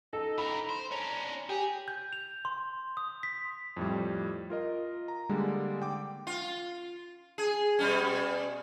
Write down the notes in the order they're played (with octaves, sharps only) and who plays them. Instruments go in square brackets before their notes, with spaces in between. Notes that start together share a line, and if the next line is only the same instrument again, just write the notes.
[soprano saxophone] D#4 [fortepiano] A4
[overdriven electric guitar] E3 A#4 [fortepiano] B5
[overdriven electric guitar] C5
[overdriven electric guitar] C#4 D4 [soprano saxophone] A#5
[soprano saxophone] G4 [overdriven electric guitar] G#4
[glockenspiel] G6
F7
C6
D#6
B6
[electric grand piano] F2 A2 G3
F4 A#4 D#5
A#5
D3 G3 G#3 A#3
D3 G5 D6
[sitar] F4
G#4
B2 G3 C#4